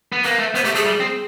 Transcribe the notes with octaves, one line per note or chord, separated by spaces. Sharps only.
B3
A#3 B4
A3
B3 C5
A3 G4
A3 G#4
G3
C4